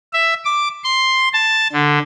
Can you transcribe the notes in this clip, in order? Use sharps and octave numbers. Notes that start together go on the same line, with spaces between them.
E5
D6
C6
A5
D3